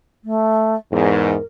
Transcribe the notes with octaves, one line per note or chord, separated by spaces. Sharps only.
A3
E2 G#2 A#4